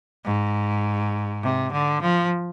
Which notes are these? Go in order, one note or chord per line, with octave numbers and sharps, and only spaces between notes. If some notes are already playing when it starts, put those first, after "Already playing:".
G#2
C3
D3
F3